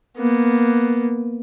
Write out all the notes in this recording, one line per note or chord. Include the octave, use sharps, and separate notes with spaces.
A#3 B3